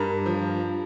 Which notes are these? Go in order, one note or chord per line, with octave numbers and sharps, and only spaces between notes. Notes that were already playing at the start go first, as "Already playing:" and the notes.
Already playing: G2 A#4
F3